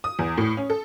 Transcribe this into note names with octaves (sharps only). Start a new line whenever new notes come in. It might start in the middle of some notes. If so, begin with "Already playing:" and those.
D#6
E2
A2
C#4
A4